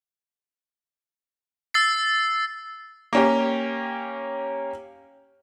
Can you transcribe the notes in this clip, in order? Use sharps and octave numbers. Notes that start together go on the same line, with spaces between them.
E6 A6 C7
A#3 C#4 G4